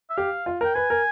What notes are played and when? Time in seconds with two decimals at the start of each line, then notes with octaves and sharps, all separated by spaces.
0.10 E5
0.17 G4 F5
0.46 F4
0.61 A#4 G5
0.75 B4 G#5
0.90 A#4